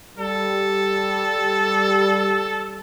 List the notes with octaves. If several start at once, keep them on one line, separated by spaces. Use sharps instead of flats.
G3 A4